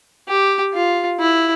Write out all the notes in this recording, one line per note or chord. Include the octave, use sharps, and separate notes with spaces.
G4
F4
E4